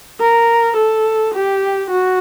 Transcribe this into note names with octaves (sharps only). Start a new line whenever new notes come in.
A#4
A4
G4
F#4